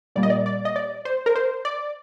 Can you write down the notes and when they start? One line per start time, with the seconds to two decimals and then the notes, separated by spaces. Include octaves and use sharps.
0.16 A#2 G3 A#3 D5
0.23 D#5
0.30 D5
0.46 D5
0.65 D#5
0.76 D5
1.05 C5
1.26 A#4
1.35 C5
1.65 D5